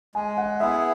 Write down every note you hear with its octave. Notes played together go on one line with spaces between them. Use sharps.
G#3 G#5
F#5
B3 E4 G#4 E5